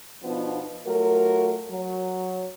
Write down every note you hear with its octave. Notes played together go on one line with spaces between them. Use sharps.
B2 F3 B3 D4 D#4 F4
F#3 A3 F4 F#4 A#4
F#3